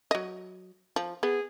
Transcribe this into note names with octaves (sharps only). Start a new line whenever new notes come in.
F#3 D#5
F3
B3 G#4